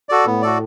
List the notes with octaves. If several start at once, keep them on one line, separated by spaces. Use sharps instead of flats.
F#4 A4 D5
A2 B3
F#4 A4 D5